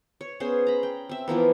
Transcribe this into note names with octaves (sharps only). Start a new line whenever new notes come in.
C#5
B3 C#4 G#4 C5
A#5 B5
G5
C4 E5
E3 F3 A#3 B3